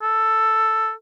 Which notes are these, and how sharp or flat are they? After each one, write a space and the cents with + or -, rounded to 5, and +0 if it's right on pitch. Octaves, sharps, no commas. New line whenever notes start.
A4 +5